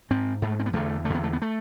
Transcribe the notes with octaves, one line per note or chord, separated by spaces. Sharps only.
G#2 C4
G#2 A3
C4
B3
E2 D3 A3
D3 A3
E2 B3
A3
B3
A3